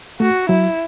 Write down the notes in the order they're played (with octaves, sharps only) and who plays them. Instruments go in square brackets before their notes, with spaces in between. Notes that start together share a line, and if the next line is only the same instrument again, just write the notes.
[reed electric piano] A3 [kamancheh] F#4
[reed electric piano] F#3 [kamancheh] E4